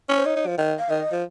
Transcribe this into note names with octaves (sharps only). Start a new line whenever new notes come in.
C#4
C5
D#4 C#5
D#4
F3
D#3
F5
D#3 D#5
F3